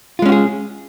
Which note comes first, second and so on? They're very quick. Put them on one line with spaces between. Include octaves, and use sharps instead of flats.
F4 G#3 C#4 F#4 G#4